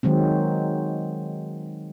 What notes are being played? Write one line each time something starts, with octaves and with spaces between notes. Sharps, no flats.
D#3 F#3 G#3 C4